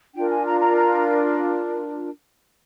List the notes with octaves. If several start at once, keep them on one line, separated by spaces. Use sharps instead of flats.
D4 F4 A#4 G5
G#5
A#5
A#5
A#5